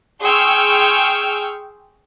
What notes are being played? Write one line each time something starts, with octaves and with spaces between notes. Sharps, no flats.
G#4 G5 C6 C#6 E6 F6